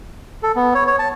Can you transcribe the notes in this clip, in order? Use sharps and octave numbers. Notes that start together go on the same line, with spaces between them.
A4
B3
C#5
C#5
A5